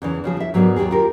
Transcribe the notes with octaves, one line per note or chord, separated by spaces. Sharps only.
E2 C#3 E3
C#3 F3 G#4
E4 E5
G#2 F#3 A#3 B3 D4 G#4
D#2 G#2 G4 G#4
F4 G4 A#4